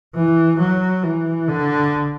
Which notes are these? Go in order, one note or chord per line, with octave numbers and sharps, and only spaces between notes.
E3
F#3
E3
D3